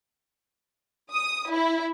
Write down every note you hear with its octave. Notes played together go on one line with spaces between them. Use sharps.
D#6
E4